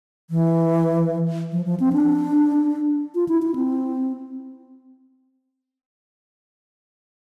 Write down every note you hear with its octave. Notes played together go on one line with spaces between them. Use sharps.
E3
F3
F3
C4
D4
F4
E4
E4
C4